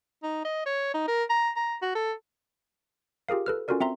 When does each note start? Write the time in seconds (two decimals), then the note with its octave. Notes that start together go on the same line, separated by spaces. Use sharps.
0.23 D#4
0.44 D#5
0.66 C#5
0.94 D#4
1.08 A#4
1.29 A#5
1.56 A#5
1.82 F#4
1.95 A4
3.29 F4 G4 G#4 A#4 F5
3.46 A4 B4 F6
3.68 C#4 F4 F#4 A4 A#4 D5
3.81 C4 E5 A#5 C6